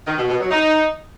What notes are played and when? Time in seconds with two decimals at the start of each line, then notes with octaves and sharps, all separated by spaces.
0.07 D#3
0.18 B2
0.29 B2
0.40 F#3
0.51 D#4